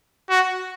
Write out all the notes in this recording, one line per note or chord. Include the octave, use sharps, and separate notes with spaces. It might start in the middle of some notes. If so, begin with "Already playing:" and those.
F#4